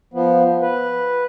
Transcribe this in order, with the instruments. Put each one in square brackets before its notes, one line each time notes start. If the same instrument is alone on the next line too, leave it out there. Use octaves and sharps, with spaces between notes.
[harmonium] F3 B3
B4